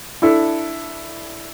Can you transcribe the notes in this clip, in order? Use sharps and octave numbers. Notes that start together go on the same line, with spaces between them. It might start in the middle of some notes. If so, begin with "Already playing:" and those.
D4 E4 A4